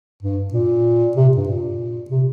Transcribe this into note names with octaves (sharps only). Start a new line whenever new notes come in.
G2
A#2
C3
G2
A#2
C3